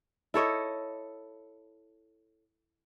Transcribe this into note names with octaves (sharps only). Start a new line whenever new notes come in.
E4 A4 C#5 D#5